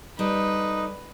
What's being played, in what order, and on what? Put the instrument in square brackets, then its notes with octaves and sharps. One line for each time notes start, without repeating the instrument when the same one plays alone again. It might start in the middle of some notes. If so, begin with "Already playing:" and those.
[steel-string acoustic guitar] G3 A4 [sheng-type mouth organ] D#4 [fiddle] B4